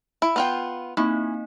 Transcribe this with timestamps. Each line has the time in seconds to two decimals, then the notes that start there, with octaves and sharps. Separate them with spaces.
0.22 E4
0.36 B3 F4 G5
0.97 A#3 C4 D#4 E4